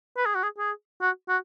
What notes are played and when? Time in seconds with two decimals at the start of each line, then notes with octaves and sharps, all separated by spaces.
0.17 B4
0.26 G#4
0.35 F#4
0.43 G#4
0.58 G#4
1.01 F#4
1.29 F#4